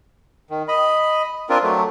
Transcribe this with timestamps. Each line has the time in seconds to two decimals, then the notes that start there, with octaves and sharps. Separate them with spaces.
0.50 D#3
0.68 D#5 B5
1.50 C4 D4 F4 A#4
1.63 F#3 A3